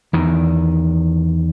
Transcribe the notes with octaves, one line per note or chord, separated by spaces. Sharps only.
E2 D#3